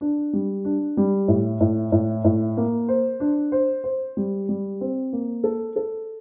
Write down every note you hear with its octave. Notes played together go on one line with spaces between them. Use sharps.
D4
G3
D4
G3
A2
A2
A2
A2
A#3
C5
D4
C5
C5
G3
G3
C4
A#3
A4
A4